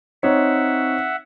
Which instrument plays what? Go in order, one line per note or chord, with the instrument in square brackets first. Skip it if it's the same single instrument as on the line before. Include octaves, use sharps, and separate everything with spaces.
[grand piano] C4 D#4 C#5 [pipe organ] E5 F#5